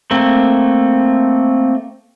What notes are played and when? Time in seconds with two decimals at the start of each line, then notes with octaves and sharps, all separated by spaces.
0.11 A3 A#3 C4